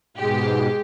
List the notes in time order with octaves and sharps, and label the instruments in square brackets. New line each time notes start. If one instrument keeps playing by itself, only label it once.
[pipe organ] G#2 B2 [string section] G#3 G4